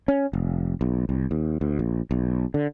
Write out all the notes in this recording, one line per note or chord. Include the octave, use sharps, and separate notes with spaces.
C#4
F1
B1
C2
D#2
D2
A#1
B1
D3